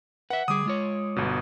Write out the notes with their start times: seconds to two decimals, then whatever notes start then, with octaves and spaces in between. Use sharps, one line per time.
0.30 B4 E5 F#5
0.48 D3 G3 G#4 D6 D#6
0.66 G#3 F4 C#5
1.16 G1 B2